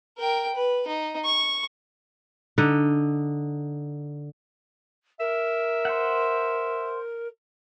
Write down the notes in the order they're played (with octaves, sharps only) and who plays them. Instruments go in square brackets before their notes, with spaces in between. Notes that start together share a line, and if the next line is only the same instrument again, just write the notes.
[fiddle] A#4 G5
B4
D#4
C#6
[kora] D3 D#4
[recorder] A#4 [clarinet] E5
[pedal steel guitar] C5 F#5